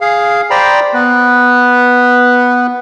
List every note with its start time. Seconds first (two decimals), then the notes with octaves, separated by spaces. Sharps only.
0.01 G#4 F5
0.51 C5 D5 G5 A#5 B5
0.94 B3 B4